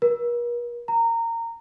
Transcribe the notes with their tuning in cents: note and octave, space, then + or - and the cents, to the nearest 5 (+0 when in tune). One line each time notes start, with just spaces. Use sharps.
A#4 +45
A#5 -20